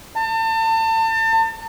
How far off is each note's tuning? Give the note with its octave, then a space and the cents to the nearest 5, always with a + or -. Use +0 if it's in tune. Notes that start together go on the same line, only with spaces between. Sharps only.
A5 +35